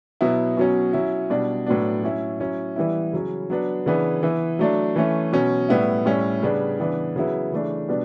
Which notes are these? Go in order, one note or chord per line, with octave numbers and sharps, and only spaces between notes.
B2 F#3 B3 E4
B2 F#3 C#4
F#3 C#4 E4
B2 G3 D4
A2 F#3 B3 D4
F#3 C#4 E4
F#3 C#4 E4
E3 G3 B3 E4
C#3 F#3 C#4
F#3 B3 D4
C#3 E3 B3 D4
E3 B3 E4
F#3 A3 D4
E3 A3 C#4
B2 F#3 C#4
A2 G3 B3 E4
A2 G3 C#4 E4
C#3 G3 B3 D4
C#3 E3 B3 D4
C#3 F#3 B3 E4
C#3 E3 A3 D4
B2 G3 B3 D4